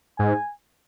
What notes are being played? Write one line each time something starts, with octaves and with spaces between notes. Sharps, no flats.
G#2 G#5